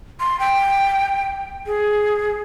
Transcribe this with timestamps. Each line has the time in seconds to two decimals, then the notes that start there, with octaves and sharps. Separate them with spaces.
0.20 C6
0.40 G5
1.66 G#4